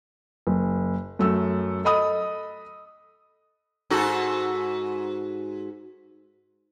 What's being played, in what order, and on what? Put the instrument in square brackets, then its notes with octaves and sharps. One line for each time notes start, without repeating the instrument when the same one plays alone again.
[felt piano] F#1
F#2 A3 E6
A4 D#5 B5 D#6
[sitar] G#2 F#4 A4